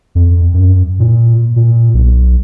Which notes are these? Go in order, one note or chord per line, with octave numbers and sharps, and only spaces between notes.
F2
F#2
A#2
A#2
B1